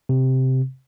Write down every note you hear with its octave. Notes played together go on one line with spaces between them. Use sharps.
C3